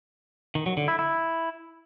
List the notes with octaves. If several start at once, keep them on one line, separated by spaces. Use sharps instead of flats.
D#3
F#3
D3
E4
E4